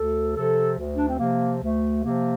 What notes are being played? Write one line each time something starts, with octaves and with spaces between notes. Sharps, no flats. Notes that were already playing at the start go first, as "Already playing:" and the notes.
Already playing: D2 A4
C3 F3 A4
D2
D4
C4
C3 F3 A#3
D2 A3
C3 F3 A#3